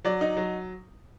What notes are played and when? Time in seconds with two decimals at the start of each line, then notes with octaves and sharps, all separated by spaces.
0.05 F#3 D5
0.21 D#4
0.37 F#3